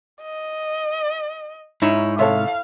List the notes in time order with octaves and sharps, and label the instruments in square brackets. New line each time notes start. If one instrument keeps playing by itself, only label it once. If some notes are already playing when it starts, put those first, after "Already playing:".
[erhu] D#5
[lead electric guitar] G#2 [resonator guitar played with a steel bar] D#4 E4 C#5
[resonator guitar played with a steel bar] C3 [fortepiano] A4 C#5 E5 [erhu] F5